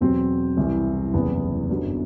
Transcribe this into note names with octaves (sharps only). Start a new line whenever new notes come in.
E2 B2 F#3 C4
C2 C3 E3
F#1 E2 C3 B3
G1 F#2 F#3